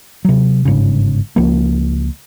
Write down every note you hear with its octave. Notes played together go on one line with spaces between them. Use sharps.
C3 F#3
G1 G#2 C#3
C#2 F3 A#3